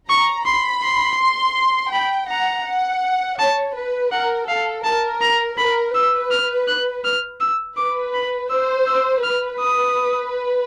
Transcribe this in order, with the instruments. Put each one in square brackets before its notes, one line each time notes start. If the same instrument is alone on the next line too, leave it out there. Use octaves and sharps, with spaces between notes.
[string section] A#5 [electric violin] C#6
[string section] B5 [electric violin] C6
[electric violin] C6
[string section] C6
[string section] G5 [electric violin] B5
[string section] F#5 [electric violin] A#5
[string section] F#5
[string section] C#5 [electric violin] A5
[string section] B4
[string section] A#4 [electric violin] F#5
[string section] A4 [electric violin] F5
[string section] A#4 [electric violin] A5
[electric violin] A#5
[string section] A#4 [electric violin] B5
[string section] B4 [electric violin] E6
[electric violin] F6
F#6
F6
E6
[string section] B4 [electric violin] D6
[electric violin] B5
[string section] C5 [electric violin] E6
[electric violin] E6
[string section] B4 [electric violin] F6
[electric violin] D#6